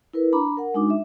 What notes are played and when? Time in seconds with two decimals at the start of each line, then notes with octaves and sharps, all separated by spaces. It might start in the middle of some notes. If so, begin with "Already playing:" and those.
0.14 E4 A#4 B4
0.33 D4 A#5 B5 D6
0.57 A#4 F#5
0.74 G#3 D4 D#4 F#4 D6
0.90 E5